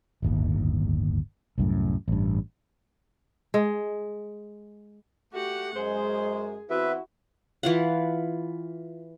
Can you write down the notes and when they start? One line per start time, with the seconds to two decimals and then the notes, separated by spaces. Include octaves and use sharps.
0.22 D1 G1 D#2
1.58 C2 F#2 A2
2.08 A1 G2
3.54 G#3
5.34 A3 F#4 G4 F#5
5.74 F#2 G#3 G#4 C5
6.70 E3 B3 C4 E4 F#4 B4 E5
7.63 E3 F4 F#5